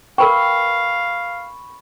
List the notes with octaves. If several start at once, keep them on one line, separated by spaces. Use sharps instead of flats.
A#4 B4 F5 G5 B5 C#6